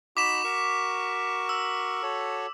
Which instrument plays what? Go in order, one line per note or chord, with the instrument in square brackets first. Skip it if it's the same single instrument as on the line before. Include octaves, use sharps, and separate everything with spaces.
[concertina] D#4 F#4 B5 [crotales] D6 B6 E7
[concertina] F#4 A#4 C#6
[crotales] E6
[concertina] F#4 A4 C#5